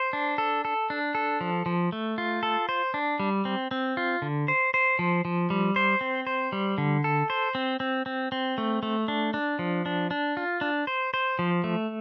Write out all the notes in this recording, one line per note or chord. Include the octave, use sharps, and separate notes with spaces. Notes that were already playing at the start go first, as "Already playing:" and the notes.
Already playing: C5
D4
A4
A4
D4
A4
F3
F3
A3
F4
A4
C5
D4
G3
C4
C4
F4
D3
C5
C5
F3
F3
G3
C5
C4
C5
G3
D3
A4
C5
C4
C4
C4
C4
A3
A3
D4
D4
F3
D4
D4
F4
D4
C5
C5
F3
A3